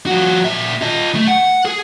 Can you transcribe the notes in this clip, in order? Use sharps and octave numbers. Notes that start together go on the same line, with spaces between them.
F3 F#4
A#2 E5
F4 D#5
A3
F#5
G#4